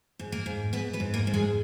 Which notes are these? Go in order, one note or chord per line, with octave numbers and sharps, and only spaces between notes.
G#2
A#3 A#4
G#2
G#2 B3 B4
B3 B4
G#2
A#3 A#4
G#2
G#3 G#4